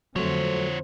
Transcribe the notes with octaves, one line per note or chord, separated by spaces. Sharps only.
F2 D3 F3 F#3 A3 C4 C#5